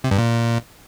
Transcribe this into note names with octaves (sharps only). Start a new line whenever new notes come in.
C3
G2
A#2